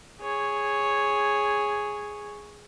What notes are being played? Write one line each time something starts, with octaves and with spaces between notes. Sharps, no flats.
G#4 C#5